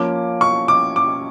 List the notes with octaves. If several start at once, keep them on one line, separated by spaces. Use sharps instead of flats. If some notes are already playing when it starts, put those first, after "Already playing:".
Already playing: F3 A#3 C#4 D6
C#6
D6
D6